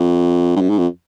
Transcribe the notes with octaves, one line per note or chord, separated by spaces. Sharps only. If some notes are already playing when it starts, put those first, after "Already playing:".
Already playing: F2
G2
F#2
G#2
F2